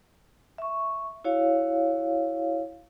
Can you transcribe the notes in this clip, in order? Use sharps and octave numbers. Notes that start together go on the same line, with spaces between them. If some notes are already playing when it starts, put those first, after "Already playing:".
E5 C#6
E4 F#4 C#5 F5